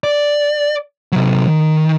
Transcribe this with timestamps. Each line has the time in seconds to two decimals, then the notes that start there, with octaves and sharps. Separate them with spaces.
0.04 D5
1.12 C3 F#3
1.48 D#3